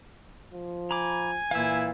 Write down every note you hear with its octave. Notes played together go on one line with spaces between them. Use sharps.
F3
G#5 A#5 B5 D6
A#2 E3 E4 F5 E6